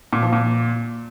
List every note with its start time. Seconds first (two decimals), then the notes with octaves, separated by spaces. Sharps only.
0.13 A#2
0.23 F3
0.33 A#2